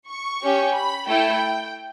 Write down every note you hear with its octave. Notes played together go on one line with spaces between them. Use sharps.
C#6
C#4 G4
B5
A3 E4 A4 G5